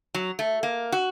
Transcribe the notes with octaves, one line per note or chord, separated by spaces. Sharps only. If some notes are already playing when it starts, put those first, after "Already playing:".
F#3
A3
A#3
F#4